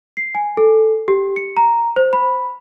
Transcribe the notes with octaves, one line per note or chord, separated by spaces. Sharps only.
C7
G#5
A4
G4
C#7
A#5
C5
B5